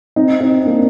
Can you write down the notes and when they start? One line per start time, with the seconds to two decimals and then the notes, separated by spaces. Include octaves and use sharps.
0.16 C4 D#4
0.41 C4 D#4
0.65 A#3 D4